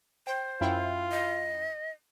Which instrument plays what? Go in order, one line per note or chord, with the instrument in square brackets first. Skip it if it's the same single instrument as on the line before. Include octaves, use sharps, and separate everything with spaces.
[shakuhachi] C5 [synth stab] G5
[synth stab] F#2 E4 G5 [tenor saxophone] F4
[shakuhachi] D#5